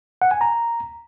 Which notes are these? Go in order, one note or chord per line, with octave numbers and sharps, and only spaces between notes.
F#5
G#5
A#5